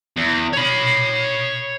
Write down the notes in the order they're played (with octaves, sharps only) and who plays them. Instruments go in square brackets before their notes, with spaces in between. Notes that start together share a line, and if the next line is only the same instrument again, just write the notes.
[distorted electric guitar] E2
C#5 B5